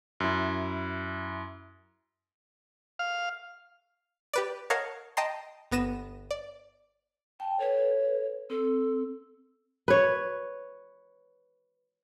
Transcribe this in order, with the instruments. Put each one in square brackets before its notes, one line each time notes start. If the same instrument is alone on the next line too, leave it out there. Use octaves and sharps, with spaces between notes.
[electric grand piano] F#2 E4
[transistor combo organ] F5
[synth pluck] G4 B4 D5
A#4 C#5 D#5 F5 F#5 A5
D#5 G5 A5 A#5 C6
G1 B3 A#6 D#7 E7
D5
[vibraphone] G5 [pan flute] A5
[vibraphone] A4 B4 [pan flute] C#5
[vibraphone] C4 [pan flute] A4
[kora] B4 C#5